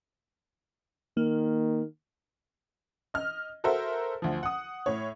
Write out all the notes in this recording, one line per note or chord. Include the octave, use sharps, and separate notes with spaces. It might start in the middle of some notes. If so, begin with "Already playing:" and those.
D#3 A#3
D#5 F6
F#4 A4 A#4 C5 E5
D2 F3
F#5 D#6
A2 C#5